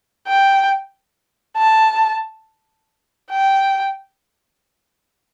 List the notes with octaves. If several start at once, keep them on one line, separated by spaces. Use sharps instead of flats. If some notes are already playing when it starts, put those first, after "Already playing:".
G5
A5
G5